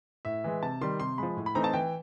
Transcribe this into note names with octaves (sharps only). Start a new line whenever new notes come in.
A2 E5
E3 G#3
C3 A5
D#3 G3 C6
C3 C6
F3 G#3 B5
A2
B5
E3 A3 C4 D#4 A#5
A5
E3 G5